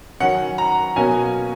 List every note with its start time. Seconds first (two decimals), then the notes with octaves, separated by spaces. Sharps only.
0.20 D#3 F#3 C#4 F#5
0.58 A#5
0.96 B2 F#3 A#3 C#4 G#5